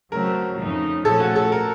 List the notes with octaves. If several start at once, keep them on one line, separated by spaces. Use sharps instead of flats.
C#3 F#3 A3 C4 A#4
F2 C#3 A3 D#4
A#2 F3 A3 C#4 A4
F#4
A4
A#4